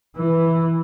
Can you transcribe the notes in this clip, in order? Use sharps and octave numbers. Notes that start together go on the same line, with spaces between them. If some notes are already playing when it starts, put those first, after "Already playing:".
E3